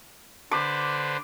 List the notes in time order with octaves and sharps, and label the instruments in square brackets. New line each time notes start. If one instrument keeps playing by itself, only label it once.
[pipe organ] D3 B4 C5 [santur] D6